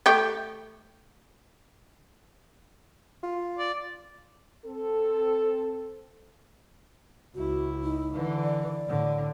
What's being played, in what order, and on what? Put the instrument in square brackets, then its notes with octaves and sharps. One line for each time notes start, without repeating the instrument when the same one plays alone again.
[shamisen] A3 G4
[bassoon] F4
[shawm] D5
[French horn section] C4 A4
[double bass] C#2 E4 [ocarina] F#4
[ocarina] D#4
[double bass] D3 E3
[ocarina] D5
[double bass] A2 D3